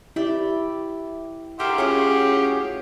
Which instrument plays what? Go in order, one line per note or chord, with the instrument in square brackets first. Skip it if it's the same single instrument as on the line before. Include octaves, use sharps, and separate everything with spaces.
[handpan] E4 [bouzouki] G4 D5 E5
[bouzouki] F#3 A#4 [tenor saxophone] G4 [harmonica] E5 F#5 C6
[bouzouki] A2 F#4 F#5 [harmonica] C#4 F4 G#4